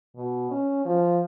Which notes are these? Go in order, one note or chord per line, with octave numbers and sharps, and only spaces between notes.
B2
C#4
F3